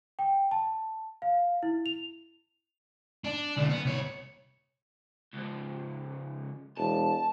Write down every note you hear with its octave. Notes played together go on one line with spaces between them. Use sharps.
G5
A5
F5
E4
F7
D4
B1 D3
B3
C2 C#5
C#2 F3
E1 A5